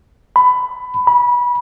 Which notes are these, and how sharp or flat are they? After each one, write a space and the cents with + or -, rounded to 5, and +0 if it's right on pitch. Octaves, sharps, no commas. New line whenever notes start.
B5 +20
B5 -20